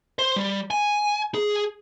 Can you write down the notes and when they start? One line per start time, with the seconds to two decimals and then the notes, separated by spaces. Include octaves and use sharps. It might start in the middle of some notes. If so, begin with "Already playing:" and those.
0.19 C5
0.36 G3
0.71 G#5
1.34 G#4